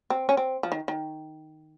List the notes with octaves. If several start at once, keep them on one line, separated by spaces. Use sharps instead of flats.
C4
C#4
C4
F3
D#3
D#3